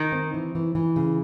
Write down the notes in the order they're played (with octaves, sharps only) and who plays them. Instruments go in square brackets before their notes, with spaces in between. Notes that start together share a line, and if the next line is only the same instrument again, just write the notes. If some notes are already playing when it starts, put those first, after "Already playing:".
Already playing: [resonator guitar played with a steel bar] D#3
[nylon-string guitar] C4
E3
E3
E3
C#3